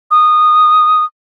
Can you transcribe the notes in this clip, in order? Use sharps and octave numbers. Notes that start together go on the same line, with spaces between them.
D#6